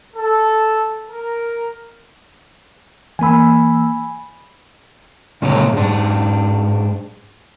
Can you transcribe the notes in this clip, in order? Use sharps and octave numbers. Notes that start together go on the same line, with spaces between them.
A4
A#4
E3 A#3 G#5 B5 E6
A#2 C#3 G#3 C4 C#5
G#2 D4